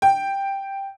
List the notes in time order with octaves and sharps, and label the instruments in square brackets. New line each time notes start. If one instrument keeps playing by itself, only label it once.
[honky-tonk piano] G5